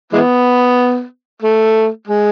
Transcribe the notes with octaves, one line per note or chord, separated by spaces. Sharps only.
E3 G#3 B3
A3
G#3